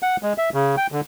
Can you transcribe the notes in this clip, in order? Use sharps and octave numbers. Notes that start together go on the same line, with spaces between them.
F#5
G#3
E5
C#3
G5
D3